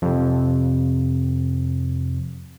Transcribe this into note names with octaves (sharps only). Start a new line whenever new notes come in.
F2 C3